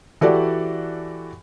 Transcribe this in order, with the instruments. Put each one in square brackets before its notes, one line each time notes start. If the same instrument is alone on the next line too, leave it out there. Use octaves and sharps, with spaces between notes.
[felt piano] E3 F#4 G4 A4 D5